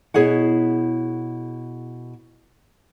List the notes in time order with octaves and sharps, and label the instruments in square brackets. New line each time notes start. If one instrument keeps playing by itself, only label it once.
[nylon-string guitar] B2 E4 G#4 C#5 F#5